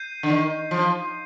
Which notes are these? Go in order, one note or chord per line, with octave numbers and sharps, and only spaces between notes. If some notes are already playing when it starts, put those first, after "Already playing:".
Already playing: G6 C7 D#7
D3
D#3
F3